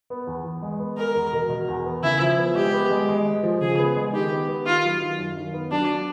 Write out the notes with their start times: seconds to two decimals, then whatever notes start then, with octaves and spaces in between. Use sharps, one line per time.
0.10 B3
0.27 E2
0.45 E2
0.62 G#3
0.80 B3
0.97 G#3 A#4
1.15 E2
1.33 B2
1.50 B2
1.68 E2
1.85 B3
2.03 C#3 E4
2.20 F3
2.38 B3
2.55 G#3 G4
2.73 B3
2.90 G#3
3.09 G#3
3.26 G#3
3.43 F3
3.61 C#3 G#4
3.78 B3
3.97 G#3
4.13 D#3 G4
4.31 B3
4.48 B3
4.66 D#3 F4
4.84 F#3
5.01 D#3
5.18 F#2
5.36 D#3
5.53 B3
5.71 F#3 D4